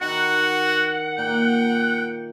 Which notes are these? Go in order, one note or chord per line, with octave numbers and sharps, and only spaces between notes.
D#3 E4 F#4 F#5
A#2 A#3 G5